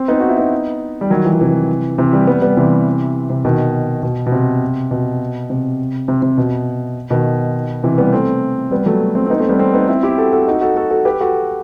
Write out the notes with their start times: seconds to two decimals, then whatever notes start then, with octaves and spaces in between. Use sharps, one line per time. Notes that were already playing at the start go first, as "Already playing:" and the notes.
Already playing: C4
0.08 B3 D#4
0.20 F#4
0.29 E4
0.37 B3 D#4
1.01 G3
1.10 D#3 F#3
1.25 E3
1.33 F#3
1.41 C3 E3
1.98 C3 E3
2.13 E3 G3
2.27 G3 B3
2.42 G3 B3
2.57 C3 E3
3.30 C3
3.45 B2 D#3
4.03 B2
4.26 B2
4.32 C3
4.91 B2
5.50 C3
6.08 C3
6.22 C3
6.38 B2
7.10 B2 D#3
7.83 C3 E3
7.98 G3 B3
8.13 A3 C4
8.71 G3 B3
8.86 F#3 A3
9.15 A3 C4
9.26 C4
9.30 B3 D#4
9.39 A3 C4
9.49 G3 B3
9.59 A3 C4
9.73 B3 D#4
9.88 C4 E4
10.03 E4 G4
10.18 F#4 A4
10.33 F#4 A4
10.48 D#4 F#4
10.61 F#4 A4
10.76 F#4 A4
10.90 F#4 A4
11.05 G4 B4
11.20 F#4 A4